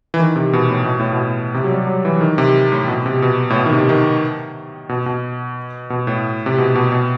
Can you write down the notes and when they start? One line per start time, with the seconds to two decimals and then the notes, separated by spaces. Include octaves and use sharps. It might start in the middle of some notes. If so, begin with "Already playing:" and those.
0.14 E3
0.20 D#3
0.36 C3
0.53 B2
0.70 A2
0.86 B2
1.00 A2
1.13 B2
1.54 C3
1.64 F#3
1.71 G3
1.87 F#3
2.05 E3
2.20 D#3
2.38 C3
2.72 A2
2.88 B2
3.06 C3
3.22 B2
3.50 A2
3.56 B2
3.66 D#3
3.72 C3
3.89 D#3
4.89 B2
5.06 B2
5.90 B2
6.07 A2
6.46 C3
6.58 B2
6.75 B2
6.92 B2